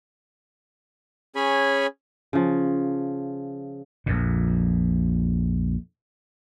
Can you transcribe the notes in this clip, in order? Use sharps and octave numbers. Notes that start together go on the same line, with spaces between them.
C#4 G#4 C#5 G#5 B5
C#3 F3
A#1 F2 A#2